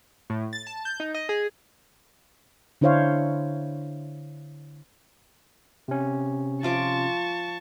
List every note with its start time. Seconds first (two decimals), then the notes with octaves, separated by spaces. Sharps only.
0.30 A2
0.53 A6
0.67 A5
0.85 G6
1.00 D#4
1.14 D#5
1.29 G#4
2.81 D3 D4 E4 C5 C#5 F5
5.88 C3 C#4
6.63 F3 F4 A5 C#6 D6